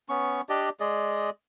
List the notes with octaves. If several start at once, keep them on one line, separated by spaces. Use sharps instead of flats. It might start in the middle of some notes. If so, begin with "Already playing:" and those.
B3 C#4 C#6
D4 G4 D5 D#5
G#3 G#4 D5 D#5